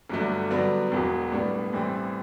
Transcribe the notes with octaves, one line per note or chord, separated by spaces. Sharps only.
G1 G2 F#3 A3 D4
G2 D3 F#3 B3 D4
E1 E2 B2 F#3
A2 G3 B3 D4
A1 A2 E3 G3 C4